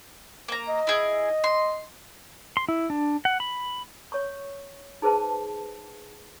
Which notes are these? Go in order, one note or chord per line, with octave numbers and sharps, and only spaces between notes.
A#3 A#5
D#5
E4 G#4
C6
C6
E4
D4
F#5
B5
C#5 C#6
D#4 G#4 B4 C5 A5